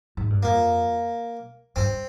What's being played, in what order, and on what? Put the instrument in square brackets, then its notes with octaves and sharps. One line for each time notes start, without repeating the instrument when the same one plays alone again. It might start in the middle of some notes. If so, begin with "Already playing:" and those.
[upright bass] G#2
G2
[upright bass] F2 [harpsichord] A#3
[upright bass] G2 [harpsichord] C4